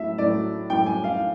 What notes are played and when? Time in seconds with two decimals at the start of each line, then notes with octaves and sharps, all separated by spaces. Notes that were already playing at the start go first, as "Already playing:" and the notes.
Already playing: A2 F#3 A3 E5
0.18 A2 F#3 A3 D5
0.70 A2 F#3 A3 G5
0.86 G#5
1.04 F5